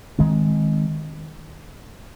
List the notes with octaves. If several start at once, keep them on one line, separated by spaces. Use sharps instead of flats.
D#3 G#3 C4